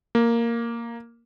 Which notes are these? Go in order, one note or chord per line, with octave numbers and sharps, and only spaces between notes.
A#3